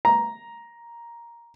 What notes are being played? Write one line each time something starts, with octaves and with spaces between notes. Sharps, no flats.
A#5